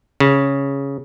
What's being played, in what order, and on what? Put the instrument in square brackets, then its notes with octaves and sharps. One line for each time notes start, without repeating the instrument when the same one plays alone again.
[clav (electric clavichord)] C#3